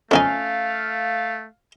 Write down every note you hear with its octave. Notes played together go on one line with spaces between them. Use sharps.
F2 A3 C4 C#4 D#4 E5 F5 G#5